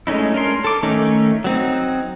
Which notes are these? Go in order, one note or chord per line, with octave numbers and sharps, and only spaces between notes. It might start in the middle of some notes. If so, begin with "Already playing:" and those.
G#3 A3 C#4 D#4 E4
C#4 D4 A#4 C6
A4 D6
D#3 A3 C#4 D#4
F#3 C4 D#4